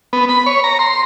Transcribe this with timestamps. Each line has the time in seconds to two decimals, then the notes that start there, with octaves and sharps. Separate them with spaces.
0.13 B3
0.29 B5
0.46 C#5
0.64 A#5
0.79 C6